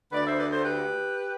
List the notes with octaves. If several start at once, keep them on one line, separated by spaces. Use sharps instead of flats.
D2 D3 B4 D5
C5 E5
B4 D5
A4 C5
G4 B4